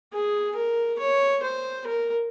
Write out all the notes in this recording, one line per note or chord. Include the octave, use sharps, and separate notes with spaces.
G#4
A#4
C#5
C5
A#4